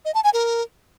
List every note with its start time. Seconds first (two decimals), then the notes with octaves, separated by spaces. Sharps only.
0.05 D#5
0.14 A5
0.24 G#5
0.33 A#4